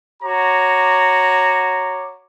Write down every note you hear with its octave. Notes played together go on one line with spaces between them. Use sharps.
F#4 C#5 A#5 D6